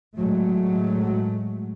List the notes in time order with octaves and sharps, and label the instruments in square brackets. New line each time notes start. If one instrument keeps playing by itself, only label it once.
[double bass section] A2 F#3 G#3 A3